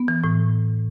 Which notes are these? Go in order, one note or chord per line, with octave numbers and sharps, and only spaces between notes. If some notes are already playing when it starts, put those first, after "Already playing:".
Already playing: B3
E3
A2